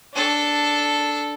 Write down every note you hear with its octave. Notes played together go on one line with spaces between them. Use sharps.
D4 A4